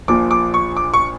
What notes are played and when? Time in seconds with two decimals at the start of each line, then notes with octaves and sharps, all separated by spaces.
0.08 A#1 A#2 F3 D6
0.31 D6
0.54 C#6
0.77 D6
0.94 C#6